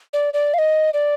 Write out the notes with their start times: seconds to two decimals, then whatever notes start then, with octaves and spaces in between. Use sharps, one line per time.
0.13 D5
0.34 D5
0.54 F5
0.58 D#5
0.94 D5